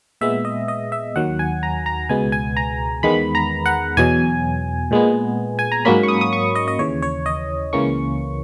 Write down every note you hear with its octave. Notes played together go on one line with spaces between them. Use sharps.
A#2 G#3 B3 E5
D#5
D#5
E5
D#2 D#3 F#3 F#5
G#5
A#5
A#5
C#2 B2 G#3 B3 G#5
G#5
A#5
E2 D#3 G#3 B3 B5
A#5
F#5
E2 B2 F#3 G#5
A#2 G#3 B3
G#5
A#5
G#2 F#3 A#3 C#4 B5
C#6
D#6
D#6
C#6
D#5
D#5
D#2 C#3 E3 C#5
C#5
D#5
C#2 C#3 E3 A#3 C#4 C#6